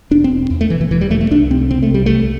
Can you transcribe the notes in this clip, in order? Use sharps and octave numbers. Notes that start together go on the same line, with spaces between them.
E1 D4
C4
E1
E2
A3
E1 E3
E3
E1 E3
G3
E1 A3
A3
C2 D4
C3 C4
C3 C4
A3
C2 G3
C2 A3